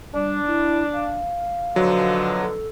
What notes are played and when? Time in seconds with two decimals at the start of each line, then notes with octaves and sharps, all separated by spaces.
0.14 G3 D4
0.47 E4
0.94 F5
1.76 B2 D3 F3 F#3
2.41 A4